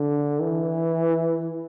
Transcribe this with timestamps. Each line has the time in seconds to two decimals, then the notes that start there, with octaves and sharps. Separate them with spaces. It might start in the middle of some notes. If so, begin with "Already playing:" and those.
Already playing: D3
0.41 E3